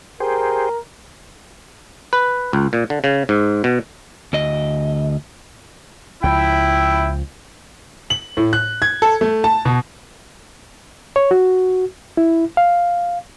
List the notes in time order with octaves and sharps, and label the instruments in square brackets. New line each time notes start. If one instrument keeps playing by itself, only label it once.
[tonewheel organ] G4 G#4 C5 [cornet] A#4
[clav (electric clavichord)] B4
C#2
A#2
D3
C#3
G#2
B2
[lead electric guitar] D2 D#5
[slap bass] C#2 F3 [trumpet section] E4 [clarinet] G5
[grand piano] F#7
A2
F#6
G#6
A4
A3
A5
B2
[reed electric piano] C#5
F#4
E4
F5